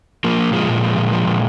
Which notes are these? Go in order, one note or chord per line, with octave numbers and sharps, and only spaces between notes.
F3 A#3
A#2
F3 G#3
A#2
F3
A#2
F3
A#2